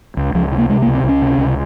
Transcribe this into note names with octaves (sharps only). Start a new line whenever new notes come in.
C#2
C#2 F3
C3
A#3
C3 G#3
A#3
C#2
C4
C#2
C#4
C3
C#2